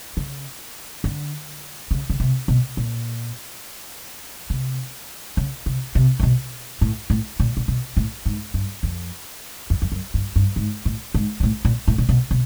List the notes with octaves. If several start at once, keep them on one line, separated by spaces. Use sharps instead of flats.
C#3
D3
C#3
C#3
C3
B2
A#2
C3
C#3
C3
C3
C3
B2
A2
A2
A#2
A#2
B2
A2
G#2
G2
F2
F2
F2
F#2
G2
G2
G#2
A2
G#2
A#2
A2
A#2
A2
A#2
B2
B2